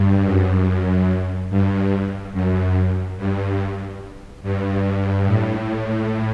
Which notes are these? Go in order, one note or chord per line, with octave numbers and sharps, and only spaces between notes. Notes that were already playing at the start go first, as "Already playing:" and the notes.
Already playing: G2
F#2
G2
F#2
G2
G2
A2